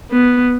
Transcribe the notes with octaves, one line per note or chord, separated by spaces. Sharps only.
B3